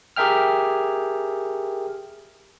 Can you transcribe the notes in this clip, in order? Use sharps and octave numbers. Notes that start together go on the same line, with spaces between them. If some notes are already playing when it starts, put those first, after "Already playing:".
G4 G#4 A#4 E5 G5 F6